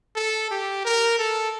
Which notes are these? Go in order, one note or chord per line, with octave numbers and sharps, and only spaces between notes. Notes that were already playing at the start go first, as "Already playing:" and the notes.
A4
G4
A#4
A4